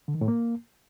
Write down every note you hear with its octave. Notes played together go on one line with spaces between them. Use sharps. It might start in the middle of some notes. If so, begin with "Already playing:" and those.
D3
D#3
A2
A#3